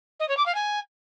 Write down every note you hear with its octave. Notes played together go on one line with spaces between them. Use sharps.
D#5
C#5
D6
F5
G#5